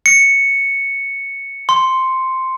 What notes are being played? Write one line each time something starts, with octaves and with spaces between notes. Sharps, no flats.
C#7
C6